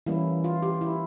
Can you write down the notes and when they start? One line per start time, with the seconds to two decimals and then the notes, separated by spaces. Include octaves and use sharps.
0.06 E3 G3 A#3 C#4 E4
0.44 F4
0.62 G4
0.81 E4